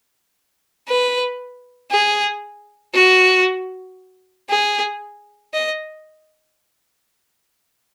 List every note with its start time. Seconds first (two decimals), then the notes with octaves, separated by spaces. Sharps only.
0.88 B4
1.92 G#4
2.94 F#4
4.50 G#4
5.53 D#5